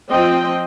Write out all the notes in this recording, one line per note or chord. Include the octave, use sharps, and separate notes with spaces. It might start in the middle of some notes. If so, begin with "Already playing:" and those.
F3 C4 D#5 G5